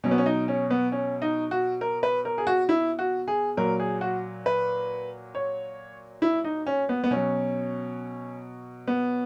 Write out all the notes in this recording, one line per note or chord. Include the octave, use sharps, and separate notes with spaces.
B2 F#3 C#4
B3
C#4
D#4
C#4
B3
C#4
D#4
F#4
A#4
B4
A#4
G#4
F#4
E4
F#4
G#4
A#2 F#3 A#4
G#4
F#4
B4
C#5
E4
D#4
C#4
B3
B3
B2 F#3 C#4
B3